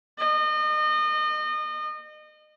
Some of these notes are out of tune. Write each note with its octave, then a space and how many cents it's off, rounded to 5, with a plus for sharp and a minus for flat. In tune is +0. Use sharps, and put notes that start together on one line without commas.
D#5 -35